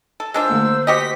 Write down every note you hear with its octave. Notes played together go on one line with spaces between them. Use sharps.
A4
G#3 D4 F4 C5 E6
D3 A3 A#3
F#4 G4 D#5 B6